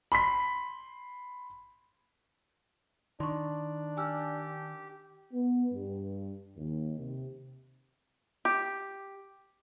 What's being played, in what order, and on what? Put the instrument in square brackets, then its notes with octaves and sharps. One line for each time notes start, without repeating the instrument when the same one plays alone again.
[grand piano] B5 C6 B6
[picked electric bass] D#3 [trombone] D4 [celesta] C6 C#6
[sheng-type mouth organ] G4 [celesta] G#5 E6 F6
[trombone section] B3
G2
D#2
C3
[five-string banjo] G4